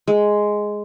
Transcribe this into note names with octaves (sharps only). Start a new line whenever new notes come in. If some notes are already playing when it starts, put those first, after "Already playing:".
G#3